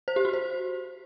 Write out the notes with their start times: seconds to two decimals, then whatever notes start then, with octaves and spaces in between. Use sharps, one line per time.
0.08 C5
0.16 G4
0.25 F#4
0.33 C5